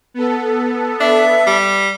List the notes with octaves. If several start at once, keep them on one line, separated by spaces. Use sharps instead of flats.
B3 A4
D4 E5
G3